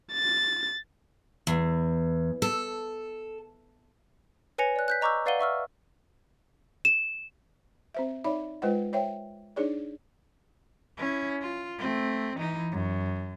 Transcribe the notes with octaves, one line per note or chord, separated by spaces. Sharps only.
A6
E2
A4
B4 C#5 G#5 A#6 C#7 F7
D5 F#6
F#6 G6 B6
D#5 A#5 C#6 D6 E6 G6
B4 D5 F5 F#5 D#7 G7
E5 C#6 E6 F6
E7
C4 C5 E5
D#4 C#5 D5 E5 B5
G#3 F4 B4 C5 D#5 F#5
C5 C#5 E5 G5
D4 D#4 G#4 C#5 D5
C#4 E4
F4
A3 C4
E3 D#4
F#2